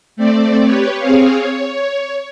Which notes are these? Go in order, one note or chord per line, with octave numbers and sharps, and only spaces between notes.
A3 C4 D5
G4 B4 C#5
C4 G#4 C#5 F5
C#5